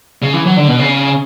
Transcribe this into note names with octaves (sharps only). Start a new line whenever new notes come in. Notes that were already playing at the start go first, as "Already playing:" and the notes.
C#3
E3
F#3
D3
B2
C#3